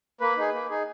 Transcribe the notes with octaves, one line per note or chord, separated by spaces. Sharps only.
A#3 B4
D#4 G#4
A#3
D#4 G#4